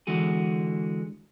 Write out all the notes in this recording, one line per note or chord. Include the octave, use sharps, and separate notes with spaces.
D3 E3 G#3 F#4 G#4